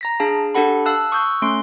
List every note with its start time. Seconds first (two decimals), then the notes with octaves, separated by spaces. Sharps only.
0.01 A#5 A#6 B6
0.20 D4 G#4 F5 A5
0.55 D4 G4 A4 F#5 B5
0.86 F5 A5 E6 F#6
1.12 C#6 D#6 E6 F#6 G6
1.42 A3 C#4 C6 D7